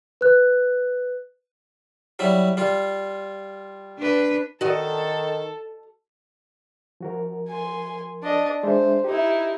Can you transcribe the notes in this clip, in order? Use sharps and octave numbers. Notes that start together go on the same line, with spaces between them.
B4 F#6
F#3 G3 E4
G3 F4
D4 B4
D#3 F#4 A4 D#5
F3 F#4 A#4
G#5 C6
D4 D#5
G#3 D4 C5 E5
D#4 E4 G4